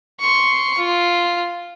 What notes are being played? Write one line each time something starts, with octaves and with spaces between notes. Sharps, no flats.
C6 C#6
F4